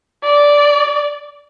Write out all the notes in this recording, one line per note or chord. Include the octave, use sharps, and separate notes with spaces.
D5